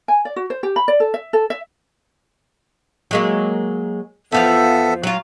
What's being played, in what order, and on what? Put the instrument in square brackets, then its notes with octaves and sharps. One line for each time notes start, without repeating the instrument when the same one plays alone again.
[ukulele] G#5
D5
F#4
C5
G4
B5
D5
A4
E5
A4
E5
[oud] F#3 G#3 A#3
[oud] E2 F3 F5 [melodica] B3 A4 E5
[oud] F#3 F4